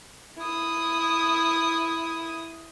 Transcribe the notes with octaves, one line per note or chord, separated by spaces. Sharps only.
E4 D#6